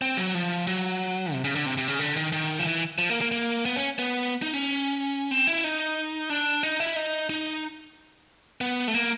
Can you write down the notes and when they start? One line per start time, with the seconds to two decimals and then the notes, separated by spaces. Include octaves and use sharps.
0.02 C4
0.17 F#3
0.35 F3
0.67 F#3
1.33 C3
1.44 C#3
1.55 D3
1.66 C3
1.78 C3
1.88 C#3
1.99 D3
2.17 D#3
2.32 D#3
2.59 F3
2.66 E3
2.98 F3
3.10 A#3
3.21 A#3
3.31 A#3
3.65 B3
3.76 C#4
3.99 B3
4.42 D#4
4.53 C#4
5.31 C4
5.47 E4
5.64 D#4
6.30 D4
6.63 D#4
6.80 E4
6.96 D#4
7.30 D#4
8.61 B3
8.88 A3
8.94 A#3